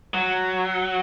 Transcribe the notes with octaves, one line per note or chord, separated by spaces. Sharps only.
F#3